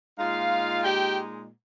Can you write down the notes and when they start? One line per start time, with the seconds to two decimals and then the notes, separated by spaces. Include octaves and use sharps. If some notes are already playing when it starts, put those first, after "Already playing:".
0.18 A#2 G#3 D#4 F4 F5
0.82 G4 G5